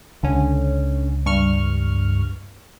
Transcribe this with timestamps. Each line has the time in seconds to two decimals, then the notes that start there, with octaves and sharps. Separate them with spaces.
0.23 C#2 D3 C#4
1.26 G2 C#6 F6